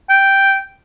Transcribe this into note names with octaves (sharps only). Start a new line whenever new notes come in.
G5